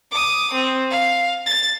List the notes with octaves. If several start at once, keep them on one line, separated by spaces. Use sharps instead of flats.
D6 D#6
C4
F5
A6